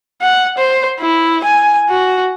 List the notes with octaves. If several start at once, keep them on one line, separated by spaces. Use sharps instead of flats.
F#5
C5
E4
G#5
F#4